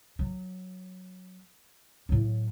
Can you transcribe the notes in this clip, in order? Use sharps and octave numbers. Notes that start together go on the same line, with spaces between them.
F#3
A2 F#3